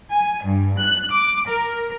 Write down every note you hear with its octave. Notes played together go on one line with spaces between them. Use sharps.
G#5
G2
F#6
D6
A#4